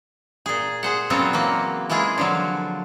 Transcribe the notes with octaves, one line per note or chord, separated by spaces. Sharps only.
A#2 G#4
G#4 C5 F#5
A#2 C#3 F#3 B3 C4 F4
E3 F#3 A#3
E3 G#3 E4 F4 G#4
D3 F3 F#3